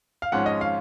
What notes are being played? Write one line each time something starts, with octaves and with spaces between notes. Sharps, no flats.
F5
G#1 G#2 F3 G#3 C#4 F#5
D#5
F5